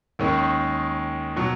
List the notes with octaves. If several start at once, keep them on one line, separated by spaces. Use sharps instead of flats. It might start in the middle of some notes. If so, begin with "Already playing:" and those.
D#2 D#3 G#3 C#4
B2 F#3